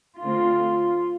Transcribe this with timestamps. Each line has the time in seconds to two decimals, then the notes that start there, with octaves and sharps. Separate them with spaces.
0.21 D3 A3 C4 F4